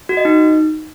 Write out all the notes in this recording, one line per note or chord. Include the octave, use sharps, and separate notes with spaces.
F#4
D#5
D#4